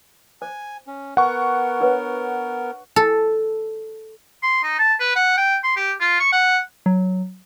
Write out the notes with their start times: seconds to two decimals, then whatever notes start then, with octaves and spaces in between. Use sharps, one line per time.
0.42 C5 G#5
0.87 C#4
1.17 B3 A#4 F#5 C#6
1.80 D4 B4 C#5
2.96 A4
4.43 C6
4.63 D#4
4.79 A5
5.00 B4
5.16 F#5
5.37 G5
5.63 C6
5.76 G4
6.00 F4
6.20 C#6
6.32 F#5
6.86 F#3